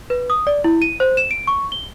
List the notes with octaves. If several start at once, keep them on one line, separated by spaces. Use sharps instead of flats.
B4
D#6
D5
E4
D#7
C5
E7
D7
C#6
G7